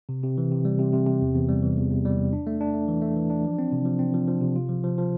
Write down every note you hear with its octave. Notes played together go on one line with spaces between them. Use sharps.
C3
C3
E3
C3
G3
C3
C3
C3
E2
E2
G3
E3
E2
E2
G3
E2
D4
A3
D4
A3
E3
A3
E3
D4
F3
C4
C3
F3
C4
F3
F3
C3
F4
F3
F3
F3